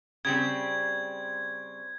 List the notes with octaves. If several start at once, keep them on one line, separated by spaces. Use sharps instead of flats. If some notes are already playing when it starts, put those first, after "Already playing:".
C#3 G3 C4 G#6